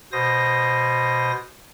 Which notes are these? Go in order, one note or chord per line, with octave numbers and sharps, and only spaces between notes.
B2 C5 D#6 A#6